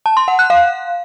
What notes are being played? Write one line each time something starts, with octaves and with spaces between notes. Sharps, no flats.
A5
C6
F#5
F#6
F5